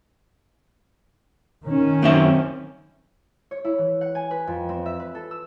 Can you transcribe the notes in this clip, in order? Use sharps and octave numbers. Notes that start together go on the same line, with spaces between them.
D#3 C#4
F#2 C4 E5
C#5
E4
E3
F#5
G#5
B4
F2
C4
E5
B4
A4
E6